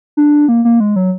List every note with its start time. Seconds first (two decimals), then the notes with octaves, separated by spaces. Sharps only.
0.17 D4
0.48 A#3
0.65 A#3
0.80 G#3
0.96 F#3